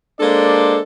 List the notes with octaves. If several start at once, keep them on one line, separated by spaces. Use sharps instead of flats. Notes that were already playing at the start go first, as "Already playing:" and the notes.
G#3 A#3 D4 A4 C5 D5